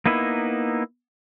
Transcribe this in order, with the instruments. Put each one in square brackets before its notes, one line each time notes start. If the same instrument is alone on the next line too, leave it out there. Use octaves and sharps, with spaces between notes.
[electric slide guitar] A#3 B3 D#4 E4